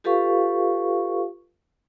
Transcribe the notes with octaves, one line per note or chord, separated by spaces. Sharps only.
F4 G4 A4 B4 F5 C#6